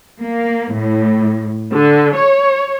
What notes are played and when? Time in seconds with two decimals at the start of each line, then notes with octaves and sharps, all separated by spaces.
0.21 A#3
0.75 A2
1.73 D3
2.16 C#5